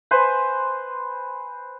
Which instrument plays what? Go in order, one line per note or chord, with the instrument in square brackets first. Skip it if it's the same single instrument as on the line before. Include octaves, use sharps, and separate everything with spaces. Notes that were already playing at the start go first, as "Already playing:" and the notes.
[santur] B4 C5 G#5